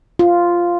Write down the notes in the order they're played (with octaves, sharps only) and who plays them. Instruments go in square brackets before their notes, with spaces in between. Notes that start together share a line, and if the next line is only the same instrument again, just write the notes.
[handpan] F4